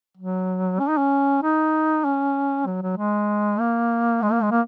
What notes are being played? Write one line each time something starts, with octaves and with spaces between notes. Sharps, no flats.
F#3
C#4
D#4
C#4
D#4
C#4
F#3
F#3
G#3
A#3
G#3
A#3
G#3
A#3